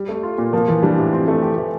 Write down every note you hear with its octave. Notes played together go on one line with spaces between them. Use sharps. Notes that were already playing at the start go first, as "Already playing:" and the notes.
Already playing: G3
A3
F4
A#2
F3 A#3
E3 F3
G3 D4
A2
C4
A3
G4
E3